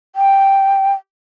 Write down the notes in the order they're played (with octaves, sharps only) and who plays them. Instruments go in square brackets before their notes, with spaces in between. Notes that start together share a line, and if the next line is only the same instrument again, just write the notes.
[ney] G5